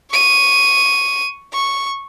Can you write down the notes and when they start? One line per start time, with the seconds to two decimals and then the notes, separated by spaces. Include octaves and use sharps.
0.11 C#6 D#7
1.53 C#6